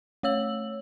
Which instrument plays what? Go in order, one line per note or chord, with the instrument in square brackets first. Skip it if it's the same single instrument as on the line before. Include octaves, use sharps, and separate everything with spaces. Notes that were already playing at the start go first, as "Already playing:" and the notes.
[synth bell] A3 C#5 E6 F#7